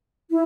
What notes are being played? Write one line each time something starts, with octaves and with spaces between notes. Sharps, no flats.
E4